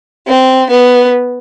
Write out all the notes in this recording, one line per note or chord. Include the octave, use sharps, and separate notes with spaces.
C4
B3